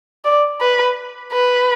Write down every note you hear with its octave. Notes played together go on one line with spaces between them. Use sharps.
D5
B4
B4